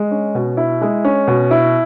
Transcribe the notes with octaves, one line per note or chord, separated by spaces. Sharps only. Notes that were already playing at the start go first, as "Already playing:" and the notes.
Already playing: G#3
C#4
B2
E4
G#3
C#4
B2
E4